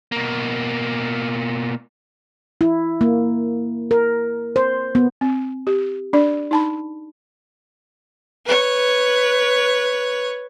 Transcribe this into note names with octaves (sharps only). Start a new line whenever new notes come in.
B2 A#3
E4
A#3
A#4
C5
B3
C4
G4
D4 D5
D#4 A5 B5
B4 C#5